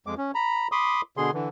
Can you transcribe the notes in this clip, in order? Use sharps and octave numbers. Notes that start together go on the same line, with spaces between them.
F2 G#3 D6
C#4
A#5 B5
B5 C6 D6 D#6
B2 D3 G#4 C6
D3 E3